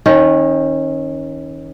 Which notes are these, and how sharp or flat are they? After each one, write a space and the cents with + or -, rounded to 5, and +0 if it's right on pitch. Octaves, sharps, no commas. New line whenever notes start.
D#3 +15 C#4 -25